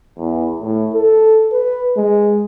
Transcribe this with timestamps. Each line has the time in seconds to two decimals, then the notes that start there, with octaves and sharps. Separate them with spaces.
0.18 E2
0.61 A2
0.93 A4
1.52 B4
1.97 G#3